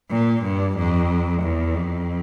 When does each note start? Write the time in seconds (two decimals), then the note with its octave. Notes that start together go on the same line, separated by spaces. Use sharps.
0.10 A#2
0.43 G2
0.77 F2
1.42 E2
1.75 F2